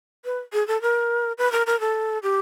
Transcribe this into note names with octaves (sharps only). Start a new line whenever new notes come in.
B4
G#4
A4
A#4
B4
A#4
A#4
A4
G4